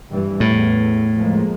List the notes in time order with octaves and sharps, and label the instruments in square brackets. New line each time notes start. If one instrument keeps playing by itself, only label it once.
[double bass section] G2 E3 G3
[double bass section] E2 [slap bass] A2
[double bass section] F3 G#3 A#3